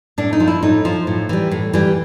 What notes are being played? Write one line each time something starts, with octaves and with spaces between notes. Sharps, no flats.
A2 D4
D#4
F3
E4
A2 D#4
F3
A2
E3 G3
A2
E3 G3